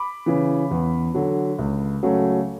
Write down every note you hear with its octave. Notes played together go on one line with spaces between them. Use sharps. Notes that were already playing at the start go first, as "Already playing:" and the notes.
Already playing: B5 D6
C#3 E3
E2
D3 F#3
C#2
C#3 F#3 A3